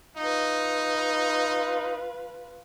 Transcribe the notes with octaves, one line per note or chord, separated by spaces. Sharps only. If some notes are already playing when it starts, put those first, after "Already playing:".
D#4 F4 B4